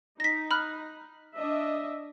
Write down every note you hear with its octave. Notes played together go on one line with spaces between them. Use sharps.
D#4 A#6 B6
B5 F6 F#6
D4 D#5 E5